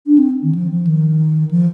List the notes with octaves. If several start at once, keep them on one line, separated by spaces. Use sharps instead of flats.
D4
C4
D#3
F3
F3
D#3
F3